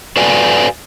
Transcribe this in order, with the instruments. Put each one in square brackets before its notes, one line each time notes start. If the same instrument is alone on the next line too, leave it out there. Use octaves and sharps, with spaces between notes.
[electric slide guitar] F#4 A4 B4 D5 F5 G#5